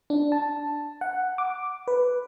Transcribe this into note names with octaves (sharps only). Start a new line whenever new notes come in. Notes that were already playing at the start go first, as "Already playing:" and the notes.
D4
A5
F#5
D6
B4